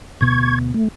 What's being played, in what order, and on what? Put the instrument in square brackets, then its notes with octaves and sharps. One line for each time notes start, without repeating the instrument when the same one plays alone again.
[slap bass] D2 B2 B3 [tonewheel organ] C#6 G#6
[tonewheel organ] A3